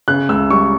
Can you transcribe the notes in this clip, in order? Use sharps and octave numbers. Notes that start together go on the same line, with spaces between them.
C#3 F#6
C#2 E6
G3 C#6